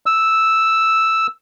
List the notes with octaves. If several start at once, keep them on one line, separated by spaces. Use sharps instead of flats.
E6